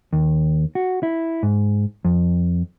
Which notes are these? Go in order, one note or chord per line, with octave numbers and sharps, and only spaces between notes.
D#2
F#4
E4
G#2
F2